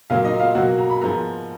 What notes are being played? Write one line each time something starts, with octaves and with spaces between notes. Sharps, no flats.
A#2 F#3 A#3 F4 F5
D#4 D#5
F4 F5
B2 F#3 A#3 F#4 F#5
A#5
B5
G#2 F3 G#3 B3 A#4 A#5